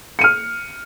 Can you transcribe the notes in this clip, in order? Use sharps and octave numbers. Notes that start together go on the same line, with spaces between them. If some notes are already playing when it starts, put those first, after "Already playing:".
F6 C#7 D#7